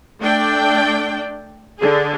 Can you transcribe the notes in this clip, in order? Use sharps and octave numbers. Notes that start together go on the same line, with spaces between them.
A3 D4 D5 G5
D3 G#4